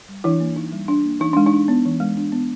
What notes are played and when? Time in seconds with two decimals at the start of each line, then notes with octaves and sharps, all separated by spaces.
0.09 G3
0.24 E3 D4 E4
0.40 A#3
0.56 E3 D#4
0.73 G3
0.88 D4
1.05 A#3
1.20 E3 D#4
1.33 G#3 D4
1.46 D#4
1.53 D4
1.68 B3
1.85 E3
2.00 G#3
2.17 D4
2.32 B3